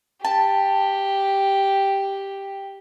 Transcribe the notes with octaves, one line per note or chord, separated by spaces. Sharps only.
G4 A5